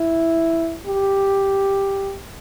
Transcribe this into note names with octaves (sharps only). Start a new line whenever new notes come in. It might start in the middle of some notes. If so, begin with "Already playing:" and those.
Already playing: E4
G4